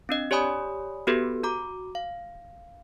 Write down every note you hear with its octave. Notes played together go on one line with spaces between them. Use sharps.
C4 D4 D#5
G4 C#5 D5 G#5 B5 D#6
B3 F#4 G4 A4 B4
F#4 A#5 D6
F5